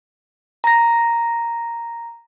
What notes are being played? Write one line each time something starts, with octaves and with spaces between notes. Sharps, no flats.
A#5 A#6